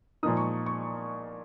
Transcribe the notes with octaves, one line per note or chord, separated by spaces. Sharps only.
A#2 F3 A#3 D#4 D#6
C#6
C#6